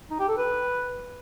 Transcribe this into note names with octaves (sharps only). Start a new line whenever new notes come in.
D#4
G4
A4
B4